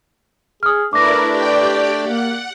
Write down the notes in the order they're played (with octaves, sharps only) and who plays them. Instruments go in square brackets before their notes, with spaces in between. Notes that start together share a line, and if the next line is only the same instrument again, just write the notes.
[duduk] G#4 [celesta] D#6 F6
[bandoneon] A3 D4 [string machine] E4 A#4 D5 [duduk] B4 [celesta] D6 A#6
[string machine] G4 D5 G5
[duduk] A#3 [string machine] F#5